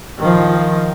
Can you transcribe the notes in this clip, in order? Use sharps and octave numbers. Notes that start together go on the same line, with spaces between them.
D#3 F3